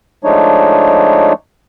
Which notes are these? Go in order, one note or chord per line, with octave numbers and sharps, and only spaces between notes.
F3 G#3 A3 D4 D#4 C#5